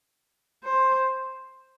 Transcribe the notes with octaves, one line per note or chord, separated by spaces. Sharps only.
C5